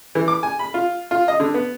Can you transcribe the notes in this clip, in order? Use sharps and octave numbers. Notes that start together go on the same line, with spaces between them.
E3
D6
G#5
B5
F4
F4
D#5
D3
B3